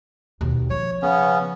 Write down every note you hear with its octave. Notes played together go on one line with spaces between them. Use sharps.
D#2 B2
F3 C#5
C#3 B3 C#4